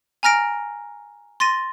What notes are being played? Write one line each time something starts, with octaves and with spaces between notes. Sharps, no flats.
G#5 A#5 F6 A#6 D7
C6 A6 A#6 D#7